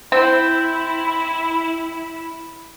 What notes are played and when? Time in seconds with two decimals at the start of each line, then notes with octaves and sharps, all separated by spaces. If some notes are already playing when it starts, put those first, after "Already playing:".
0.12 C4 E4